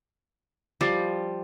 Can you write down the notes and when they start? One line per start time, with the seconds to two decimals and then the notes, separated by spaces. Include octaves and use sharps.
0.81 F3 G3 D6 A6 C7